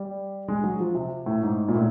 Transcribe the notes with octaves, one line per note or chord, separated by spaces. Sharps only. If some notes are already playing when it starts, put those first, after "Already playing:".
Already playing: G3
G#3
F#3
F3
C3
A2
G#2
A#2
A2